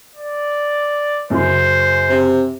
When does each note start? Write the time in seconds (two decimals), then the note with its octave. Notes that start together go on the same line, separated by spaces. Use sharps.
0.16 D5
1.30 F#2 C#3 F#4 C5
2.09 C3